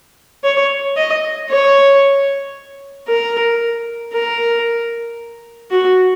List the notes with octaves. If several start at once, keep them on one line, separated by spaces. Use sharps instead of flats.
C#5
D#5
C#5
A#4
A#4
F#4